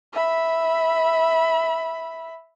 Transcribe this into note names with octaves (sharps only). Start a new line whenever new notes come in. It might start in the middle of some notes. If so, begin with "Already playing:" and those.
E5 B5